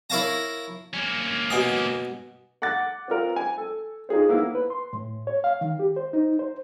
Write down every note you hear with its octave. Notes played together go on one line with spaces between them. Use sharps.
E4 A#4 C#5 F5 A5 A#5
A#3 C#4
B2 G#5 D#6
F#5 D6 F#6 A6
C4 F4 A#4
G#5
A4
D#4 F4 G#4 C5
D#3 A#3 B3 E4
B4
C6
A2
C#5
F5
D#3
G4
C5
D#4
C5